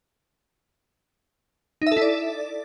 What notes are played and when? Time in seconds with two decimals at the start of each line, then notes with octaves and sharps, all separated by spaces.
1.82 D#4
1.87 E5
1.92 A4
1.97 E4
2.02 D5